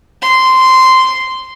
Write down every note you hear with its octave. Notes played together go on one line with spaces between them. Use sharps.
C6